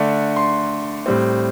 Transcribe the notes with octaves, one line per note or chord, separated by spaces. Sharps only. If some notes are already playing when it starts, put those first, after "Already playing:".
Already playing: D3 A3 D4
C6
A2 G3 C4